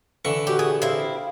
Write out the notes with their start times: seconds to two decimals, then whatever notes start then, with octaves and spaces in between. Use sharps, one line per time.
0.25 D3 E3 C#6
0.47 F#4 G4
0.59 G#4
0.82 C4 E4 F5